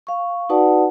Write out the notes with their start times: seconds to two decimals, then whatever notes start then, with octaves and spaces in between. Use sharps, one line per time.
0.07 F5 C#6
0.49 D#4 F#4 B4 D5 F#5 A5